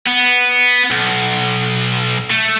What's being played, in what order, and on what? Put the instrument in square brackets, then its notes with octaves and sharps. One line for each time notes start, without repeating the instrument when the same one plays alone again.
[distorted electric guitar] B3
B1
A3